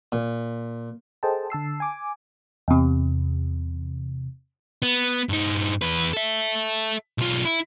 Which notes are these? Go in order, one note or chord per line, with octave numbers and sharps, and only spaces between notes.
A#2
G#4 A4 C5 D#5 G5 A5
D3 A5 E6 C7
G#5 D6
E2 C3
B3
G2 D#4
E2 B4
A4 E5
B1 F4
E4